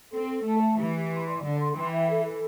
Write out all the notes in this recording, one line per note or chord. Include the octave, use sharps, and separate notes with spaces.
C4 A4
A4
A3 A5
E5
E3 G4
G4
C6
D5
D3 A4
C6
E3 G5
E5
A4
A4